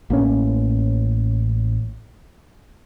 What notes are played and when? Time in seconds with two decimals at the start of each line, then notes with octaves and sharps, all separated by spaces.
0.10 A1 A#3 C4 C#4